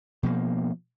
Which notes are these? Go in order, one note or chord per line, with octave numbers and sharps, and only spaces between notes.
B2 F3 A#3